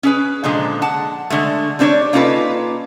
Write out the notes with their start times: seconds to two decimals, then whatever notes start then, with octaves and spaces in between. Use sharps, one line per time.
0.03 C#4 G#4 B4
0.44 A#2 D3 F3 G#3 A#5
0.82 F#5 A5
1.30 D3 G#3 A3
1.79 G3 C4 D4 B4 C#5 D5
2.13 A#3 C#4 D#4 F4 A4 B4